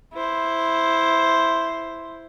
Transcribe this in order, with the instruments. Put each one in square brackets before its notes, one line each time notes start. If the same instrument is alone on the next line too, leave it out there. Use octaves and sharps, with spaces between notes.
[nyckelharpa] E4 C5